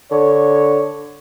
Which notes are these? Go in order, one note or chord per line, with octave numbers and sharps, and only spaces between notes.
D3 C#5